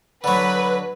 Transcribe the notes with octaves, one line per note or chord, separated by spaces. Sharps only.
D3 F#3 B4